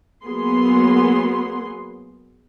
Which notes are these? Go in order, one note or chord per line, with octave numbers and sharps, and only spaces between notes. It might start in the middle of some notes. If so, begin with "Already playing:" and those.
F#3 A#3 B3 G#4 C6